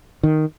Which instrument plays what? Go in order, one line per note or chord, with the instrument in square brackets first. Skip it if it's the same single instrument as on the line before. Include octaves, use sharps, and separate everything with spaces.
[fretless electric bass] D#3